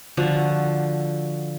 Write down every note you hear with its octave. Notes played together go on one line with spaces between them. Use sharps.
D3 F3 F#4